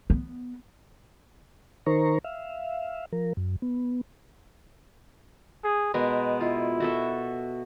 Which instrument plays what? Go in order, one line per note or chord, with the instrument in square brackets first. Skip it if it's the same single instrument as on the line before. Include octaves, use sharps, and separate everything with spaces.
[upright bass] B3
[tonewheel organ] D#3 D#4 A#4 C5 A#5 C#6
E5 F5
F3 A#4
F#2
B3
[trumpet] G#4
[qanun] B2 G#3 A#4 [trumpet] B4
[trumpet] E4 [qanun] F4
[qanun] F#4 A4 E5